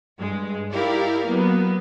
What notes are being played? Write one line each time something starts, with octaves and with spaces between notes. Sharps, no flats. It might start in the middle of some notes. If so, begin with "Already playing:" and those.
G2 G#3
D#4 E4 G4 A#4 D5 F5
F#3 A#3 B3